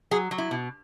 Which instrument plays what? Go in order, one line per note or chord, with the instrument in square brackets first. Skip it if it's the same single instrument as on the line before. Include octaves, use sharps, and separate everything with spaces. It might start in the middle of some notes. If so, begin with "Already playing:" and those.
[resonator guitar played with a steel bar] F#3 G#4
F#3
E4
B2